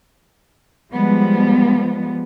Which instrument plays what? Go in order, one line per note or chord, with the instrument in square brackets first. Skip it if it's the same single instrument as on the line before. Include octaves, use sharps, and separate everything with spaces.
[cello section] F3 G3 G#3 B3